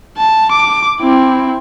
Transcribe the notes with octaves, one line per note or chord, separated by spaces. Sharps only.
A5
D6
C4 E4